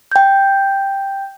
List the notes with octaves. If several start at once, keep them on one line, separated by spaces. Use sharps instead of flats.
G5 G6